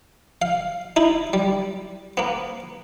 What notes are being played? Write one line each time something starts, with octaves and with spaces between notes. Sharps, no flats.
F5
D#4 E4
G3
A#3 B3